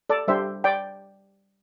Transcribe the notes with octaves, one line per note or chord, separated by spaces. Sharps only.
A4 D5
G3 D4 G4 C5 E5
D5 G5